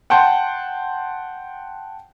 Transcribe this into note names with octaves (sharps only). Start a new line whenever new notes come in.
F#5 G5 A5 C6 G6